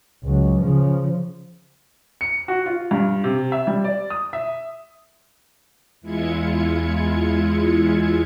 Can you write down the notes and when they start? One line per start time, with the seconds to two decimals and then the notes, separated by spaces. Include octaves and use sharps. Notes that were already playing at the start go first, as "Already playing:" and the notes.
0.24 C#2 F#3
0.60 C#3 F3
2.21 C#7
2.48 F#4
2.66 F4
2.91 G2
3.24 C3
3.52 E5
3.67 G3
3.84 D5
4.10 D#6
4.33 E5
6.01 E2 G#3 E4 F4 G#6 C#7